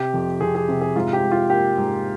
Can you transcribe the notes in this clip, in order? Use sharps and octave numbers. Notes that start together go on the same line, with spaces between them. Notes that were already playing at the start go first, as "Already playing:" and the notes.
Already playing: C3 G4
F2
F2 G#4
G#4
C3
G#4
G#2 F4
G4
G#2
F4
A#3 G4
G#2